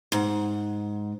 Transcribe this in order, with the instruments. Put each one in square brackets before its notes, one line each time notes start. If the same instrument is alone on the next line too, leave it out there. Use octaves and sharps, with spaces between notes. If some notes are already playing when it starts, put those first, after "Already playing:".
[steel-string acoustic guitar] G#2 F#5